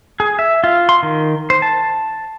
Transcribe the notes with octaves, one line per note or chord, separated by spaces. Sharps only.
G#4
E5
F4
C6
D#3
C5
A5